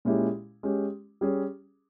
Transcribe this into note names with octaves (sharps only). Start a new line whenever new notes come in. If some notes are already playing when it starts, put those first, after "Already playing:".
A#2 G#3 C#4 E4 G4
G#3 C#4 G4
G3 C#4 G#4